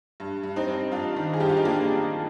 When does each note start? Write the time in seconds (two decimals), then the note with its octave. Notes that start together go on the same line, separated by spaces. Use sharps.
0.20 G2
0.44 G2
0.56 C4 D#4
0.68 G2
0.92 G2 D4 F4
1.16 D#3
1.33 G#4
1.40 G2 G4
1.49 F4
1.57 D#4
1.65 A#3 D4